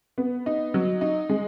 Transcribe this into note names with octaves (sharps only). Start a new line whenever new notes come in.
B3
D#4
F#3
D#4
G#3